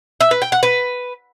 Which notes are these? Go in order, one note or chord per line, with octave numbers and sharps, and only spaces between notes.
E5
B4
G5
F#5
B4